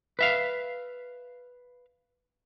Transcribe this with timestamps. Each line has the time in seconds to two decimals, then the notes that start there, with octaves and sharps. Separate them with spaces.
0.19 B4 E5 F5